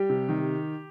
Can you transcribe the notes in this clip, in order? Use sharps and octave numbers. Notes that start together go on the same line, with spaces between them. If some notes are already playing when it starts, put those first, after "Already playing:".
Already playing: G3 G4
C3
D#3